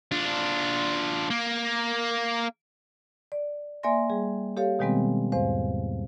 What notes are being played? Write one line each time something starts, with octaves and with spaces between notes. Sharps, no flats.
D4 F4
A#3
D5
A#3 D5 E5 G#5 C6 A#6
G3 G#4
G4 A4 C#5 F5
B2 D#3 G3 G#3 B3 C4
E2 G#2 C5 F5